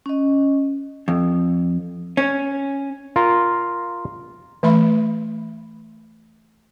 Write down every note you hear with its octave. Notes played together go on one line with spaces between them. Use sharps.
C#4 D#5
F2
C#4
F4 A#4
E3 A3 E5 B5